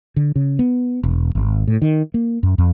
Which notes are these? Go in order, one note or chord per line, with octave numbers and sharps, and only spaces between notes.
D3
C#3
B3
E1
G#1
A2
D#3
A#3
F#2
F2